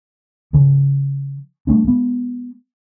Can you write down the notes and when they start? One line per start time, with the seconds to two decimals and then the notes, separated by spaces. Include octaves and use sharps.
0.53 C#3 F3
1.67 G3 A3 D4
1.84 G#3 B3